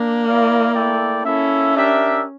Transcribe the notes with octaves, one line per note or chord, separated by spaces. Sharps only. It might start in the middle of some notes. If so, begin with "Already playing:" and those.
Already playing: A#3 D4
E4 A#4 D5 F5
A3 E4 A4 D5 G5
A#3 C#4 E4 A4 E5
D4 G4 A#4 E5